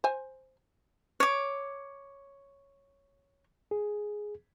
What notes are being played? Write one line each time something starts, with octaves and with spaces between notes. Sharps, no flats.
C5 G#5
C#5 D6
G#4